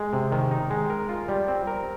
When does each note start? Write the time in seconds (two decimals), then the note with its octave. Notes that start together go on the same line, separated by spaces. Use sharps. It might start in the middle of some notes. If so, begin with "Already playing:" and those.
Already playing: G#3
0.13 C3
0.32 D#3
0.51 D#4
0.70 G#3
0.90 A#4
1.09 F4
1.28 G3
1.48 C4
1.67 A#4